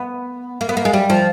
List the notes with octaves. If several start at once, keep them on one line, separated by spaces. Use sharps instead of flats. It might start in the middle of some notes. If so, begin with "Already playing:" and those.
Already playing: B3
A#3
B3
A#3
G#3
G3
F3